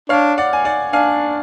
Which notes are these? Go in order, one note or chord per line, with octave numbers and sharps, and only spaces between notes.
D4 C#5 F5
D5 F#5
G#5
D5 F#5
D4 F5 G#5